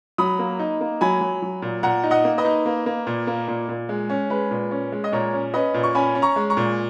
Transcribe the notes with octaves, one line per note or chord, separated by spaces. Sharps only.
F#3 B5 D#6
A#3
D#4
A#3
F#3 G#5 B5
F#3
F#3
A#2
A#2 F#5 A#5
D#4
D#5 F#5
A#3
B4 D#5
D#4
A#3
A#3
A#2
A#3
A#2
A#2
G#3
C#4
G#3 B4
A#2
C#4
G#3
D#5
A#2 A#4 C#5
C#4
C#4 B4 D#5
A#2
C#6
C#4 G#5 B5
C#4
A#5 C#6
G#3
A#5 C#6
A#2